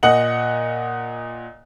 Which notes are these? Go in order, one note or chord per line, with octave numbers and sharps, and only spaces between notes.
A#2 D#5 F#5 F#7